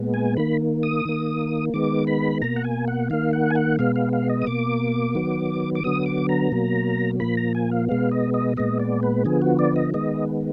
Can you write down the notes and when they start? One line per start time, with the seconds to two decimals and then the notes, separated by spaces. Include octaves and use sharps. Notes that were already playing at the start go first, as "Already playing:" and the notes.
Already playing: A#2 G#3 B3
0.14 G#5
0.37 D#3 A#3 B5
0.83 D#6
1.05 D#3 A#3
1.74 D#3 G#3 B3 D6
2.07 B5
2.42 B2 A#3 A#5
2.56 F#5
2.64 G#5
2.88 F#5
3.10 D#3 A#3 F5
3.33 F#5
3.51 G#5
3.55 F#5
3.79 B2 G#3 B3 F5
3.96 F5
4.13 F5
4.30 D#5
4.42 D#6
4.47 B2 A#3 D6
5.15 D#3 F#3 B3
5.75 D6
5.84 D3 F#3 B3 D#6
6.06 D6
6.29 A#5
6.52 B2 F#3 A#3
7.20 A#2 F3 A#3 B5
7.37 A#5
7.55 G#5
7.71 F5
7.89 B2 G#3 B3 F5
8.11 D#5
8.34 D#5
8.57 A#2 G#3 B3 D#5
8.79 D5
9.03 B4
9.25 D3 F3 B3 G#4
9.42 F#4
9.59 D5
9.76 D#5
9.94 D#3 G#3 B3 D#5